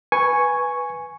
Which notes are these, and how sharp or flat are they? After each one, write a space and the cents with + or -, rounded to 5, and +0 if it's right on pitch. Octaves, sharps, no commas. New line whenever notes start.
B4 -5 G#5 +0 C#6 +0